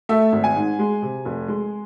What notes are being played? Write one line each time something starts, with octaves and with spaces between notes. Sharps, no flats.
A3 E5
G#1
G#5
G#2
G#3
C3
F1
G#3